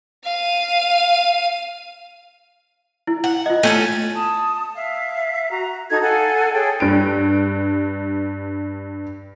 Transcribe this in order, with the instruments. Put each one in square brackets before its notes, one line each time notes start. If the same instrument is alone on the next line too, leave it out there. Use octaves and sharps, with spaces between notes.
[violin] F5 D#7
[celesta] E4
[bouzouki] F#5
[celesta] F4 D#5
[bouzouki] A3 C#4 A4 [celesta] D#7
[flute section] A5 D#6
E5 F5
F#4 A#5
D#4 F#4 A4 G#6
A4 F5 F#5 G#5
G#4 A4 C#5 G5
[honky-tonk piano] G2 D7